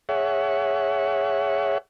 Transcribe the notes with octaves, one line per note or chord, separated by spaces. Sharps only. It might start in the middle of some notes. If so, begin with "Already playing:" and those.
G#4 C#5 E5 F#5